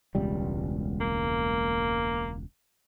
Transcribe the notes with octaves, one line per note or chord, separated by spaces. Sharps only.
E1 C#2 G3
A#3